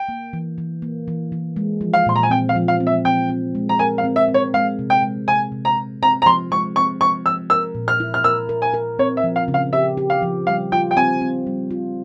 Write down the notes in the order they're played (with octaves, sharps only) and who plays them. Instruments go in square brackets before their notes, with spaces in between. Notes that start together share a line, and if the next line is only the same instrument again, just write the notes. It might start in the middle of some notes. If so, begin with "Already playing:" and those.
Already playing: [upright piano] G5
[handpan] A#3
E3
E3
A#3
E3
E3
G#3
F3
[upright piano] F5
[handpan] A#2 [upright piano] C6
[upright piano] A#5
G#5
[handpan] C4 [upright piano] G5
[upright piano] F5
[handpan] F3
[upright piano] F5
[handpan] C4
[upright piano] E5
[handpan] C4 [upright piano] G5
[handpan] C4
G#3
[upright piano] A#5
[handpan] A#4 [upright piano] G#5
[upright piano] F5
[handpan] C4
[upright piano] E5
[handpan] C4
[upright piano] C#5
[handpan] G#3 [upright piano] F5
[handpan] C3
[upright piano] G5
[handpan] G#3
[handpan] C3 [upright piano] G#5
[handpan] C3
[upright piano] A#5
[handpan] C3
[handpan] C4 [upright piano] A#5
[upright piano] A#5
[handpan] F3 [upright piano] C6
[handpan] G#3 [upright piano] C#6
[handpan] C4 [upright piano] C#6
[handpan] F3 [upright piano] C#6
[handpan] F3 [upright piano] E6
[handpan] A#4 [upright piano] E6
[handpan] A#2
[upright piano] F6
[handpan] E4
[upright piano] F6
[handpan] A#4 [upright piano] E6
[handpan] A#4
[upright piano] G#5
[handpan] A#4
[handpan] C4 [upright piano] C#5
[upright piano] E5
[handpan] F3
[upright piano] F5
[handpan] C#3
[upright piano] F5
[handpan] G4 [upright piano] E5
[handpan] G4
[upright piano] F5
[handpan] F3
[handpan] G3 [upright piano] F5
[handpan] F4 [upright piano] G5
[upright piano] G5
[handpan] C4 [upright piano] G#5
[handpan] C4
G3
F4